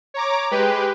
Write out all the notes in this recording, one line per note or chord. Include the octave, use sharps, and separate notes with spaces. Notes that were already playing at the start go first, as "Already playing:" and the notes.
C#5 A#5 D6
G#3 G4 B4